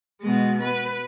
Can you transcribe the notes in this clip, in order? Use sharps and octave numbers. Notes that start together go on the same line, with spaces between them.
B2 G#3
B4